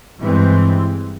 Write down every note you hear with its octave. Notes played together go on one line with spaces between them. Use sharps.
G2 E3 G#3 C4